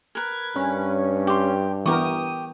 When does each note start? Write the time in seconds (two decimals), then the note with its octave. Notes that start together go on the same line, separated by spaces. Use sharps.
0.15 A#4 B4 G#6
0.56 G2 C#4
1.27 G4 C6
1.86 E3 B3 G4 A#4 C#6 D#6